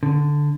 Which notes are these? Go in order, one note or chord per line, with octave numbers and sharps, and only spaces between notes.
D3